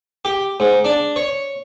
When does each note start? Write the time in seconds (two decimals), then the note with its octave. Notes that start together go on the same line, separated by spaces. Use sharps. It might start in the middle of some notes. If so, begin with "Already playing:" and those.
0.25 G4
0.60 G#2
0.84 D4
1.16 C#5